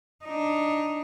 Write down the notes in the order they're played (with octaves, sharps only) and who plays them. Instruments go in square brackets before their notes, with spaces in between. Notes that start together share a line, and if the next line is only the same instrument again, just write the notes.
[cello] D4 D#4